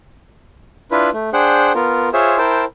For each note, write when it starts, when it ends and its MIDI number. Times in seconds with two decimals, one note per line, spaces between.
0.91 1.10 62
0.91 1.10 64
0.91 1.10 65
0.91 1.10 71
1.13 1.30 57
1.33 1.72 62
1.33 1.72 68
1.33 1.72 72
1.33 1.72 78
1.33 1.72 79
1.75 2.09 59
1.75 2.09 65
1.75 2.09 70
2.13 2.38 65
2.13 2.38 68
2.13 2.38 72
2.13 2.38 73
2.13 2.38 76
2.38 2.65 64
2.38 2.65 70
2.38 2.65 72
2.38 2.65 79
2.38 2.65 81